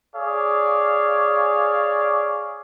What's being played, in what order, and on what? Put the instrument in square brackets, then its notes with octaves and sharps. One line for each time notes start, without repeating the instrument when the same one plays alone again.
[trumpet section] G#4 C#5 D5 F5